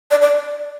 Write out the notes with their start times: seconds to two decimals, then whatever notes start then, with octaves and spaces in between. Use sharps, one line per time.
0.11 D5
0.21 D5